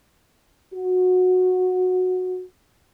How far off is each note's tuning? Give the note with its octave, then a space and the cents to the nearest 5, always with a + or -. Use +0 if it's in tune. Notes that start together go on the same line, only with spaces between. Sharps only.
F#4 -15